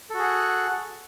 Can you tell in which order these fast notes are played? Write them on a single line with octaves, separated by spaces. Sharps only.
A4 F#4 G#4 F#5